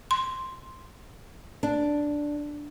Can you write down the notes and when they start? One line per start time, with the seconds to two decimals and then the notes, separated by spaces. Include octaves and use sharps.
0.11 C6
1.63 D4